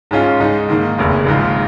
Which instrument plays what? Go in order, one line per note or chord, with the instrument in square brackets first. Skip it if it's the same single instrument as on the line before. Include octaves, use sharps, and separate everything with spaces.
[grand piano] G#2 G#3 C#4 F4
G#2 G#3 D#4
G#2 D#3 A#3
F1 D#2 C#3
A#1 G#2 D#3 G#3 F4